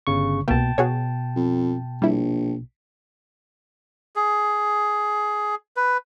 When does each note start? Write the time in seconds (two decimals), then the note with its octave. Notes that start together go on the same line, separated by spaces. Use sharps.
0.07 G1 C#3 C#6
0.48 C2 B2 A#3 G5 A5
0.78 B2 F#4 G#4 C#5
1.36 F2
2.02 A#1 G3 E4
4.16 G#4
5.76 B4